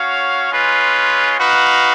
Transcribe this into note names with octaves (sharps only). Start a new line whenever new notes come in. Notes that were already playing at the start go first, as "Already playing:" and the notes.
Already playing: C#4 F#4 C#5 F5
G#3 C#4 F4 B4
D#4 F#4 B4 F5